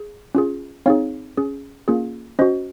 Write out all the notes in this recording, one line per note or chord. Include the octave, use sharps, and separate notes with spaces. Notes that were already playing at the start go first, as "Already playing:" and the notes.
Already playing: G#4
C#4 F4 G#4
C4 D#4 G#4 C#5 F5
C#4 G#4
A#3 C#4 F4 G#4
C#4 F#4 C5 D#5